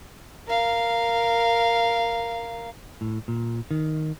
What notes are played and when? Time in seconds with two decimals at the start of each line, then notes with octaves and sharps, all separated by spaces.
0.47 A#4 F5
3.01 A2
3.28 A#2
3.71 D#3